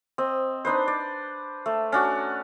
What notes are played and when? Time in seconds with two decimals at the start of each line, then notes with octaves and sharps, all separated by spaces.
0.18 C4 D#5
0.65 D4 D#4 B4 C5
0.88 D5
1.66 A3
1.92 C#4 D4 F#4